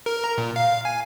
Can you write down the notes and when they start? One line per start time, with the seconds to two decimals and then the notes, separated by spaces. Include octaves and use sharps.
0.06 A#4
0.24 A#5
0.38 A#2
0.56 F5
0.85 G#5